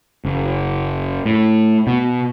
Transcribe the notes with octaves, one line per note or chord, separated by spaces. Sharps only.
F#1
A2
B2